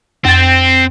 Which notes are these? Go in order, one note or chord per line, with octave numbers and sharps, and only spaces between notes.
F2 C4 A6